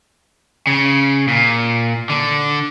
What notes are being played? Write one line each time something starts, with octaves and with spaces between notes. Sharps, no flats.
C#3
A#2
D3